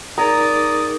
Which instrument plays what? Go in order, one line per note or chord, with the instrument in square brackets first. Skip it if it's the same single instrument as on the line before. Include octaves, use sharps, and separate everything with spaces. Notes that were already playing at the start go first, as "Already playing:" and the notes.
[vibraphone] D#4 G#4 A#4 [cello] D5 [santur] A#5 [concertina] D#6